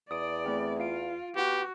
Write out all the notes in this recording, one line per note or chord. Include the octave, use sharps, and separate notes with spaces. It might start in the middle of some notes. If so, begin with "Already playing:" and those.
E2 D5 D#6 D7
A3 C4 G#4
F4 F5 D7
B3 F#4 G4